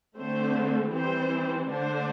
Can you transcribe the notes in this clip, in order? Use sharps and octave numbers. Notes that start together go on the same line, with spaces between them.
D3 A3 C4 C5
E3 G3 C4 C5
D3 A3 D4 C5